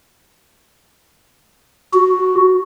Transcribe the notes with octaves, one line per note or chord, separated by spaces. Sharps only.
F#4